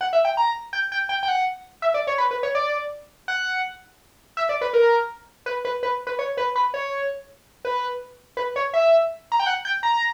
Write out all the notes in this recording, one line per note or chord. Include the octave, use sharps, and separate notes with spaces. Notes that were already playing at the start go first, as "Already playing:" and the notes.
F#5
E5
G5
A#5
G5
G5
G5
G5
F#5
E5
D5
C#5
B4
B4
C#5
D5
F#5
E5
D5
B4
A#4
B4
B4
B4
B4
C#5
B4
B4
C#5
B4
B4
C#5
E5
A#5
G5
F#5
G5
A#5